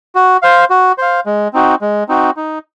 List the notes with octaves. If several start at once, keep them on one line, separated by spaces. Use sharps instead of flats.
F#4
C5 F5
F#4
C5 F5
G#3
C4 D#4 F#4
G#3
C4 D#4 F#4
D#4